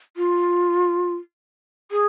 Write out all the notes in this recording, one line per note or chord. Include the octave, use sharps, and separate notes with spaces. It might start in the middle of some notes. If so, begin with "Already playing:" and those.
F4
G#4